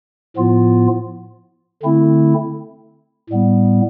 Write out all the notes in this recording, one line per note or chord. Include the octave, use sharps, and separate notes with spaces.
A2 F3 B3 F4
D3 A3 C4 E4
A2 G3 B3